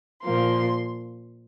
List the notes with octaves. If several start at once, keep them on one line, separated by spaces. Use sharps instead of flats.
A#2 F3 A#3 C6